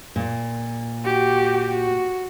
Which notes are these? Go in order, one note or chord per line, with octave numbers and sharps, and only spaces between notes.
A#2
F#4 G4
F#4